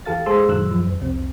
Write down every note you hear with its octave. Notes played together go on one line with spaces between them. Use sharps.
E2 E3 G4 A4 F5 A6
G#3 G#4 A4 C5 C6 E6
F#2 A#2 D#3 F#3 E6 F#6
F#2 F3
F2
C2 F2 C4